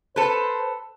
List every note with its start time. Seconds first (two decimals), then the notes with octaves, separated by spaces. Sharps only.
0.16 A4 B4 C5